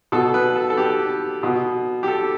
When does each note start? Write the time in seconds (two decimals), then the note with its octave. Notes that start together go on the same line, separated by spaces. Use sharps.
0.12 B2 A4
0.34 B4
0.56 A4
0.70 A4
0.77 G4
1.43 B2
2.03 G4
2.08 A4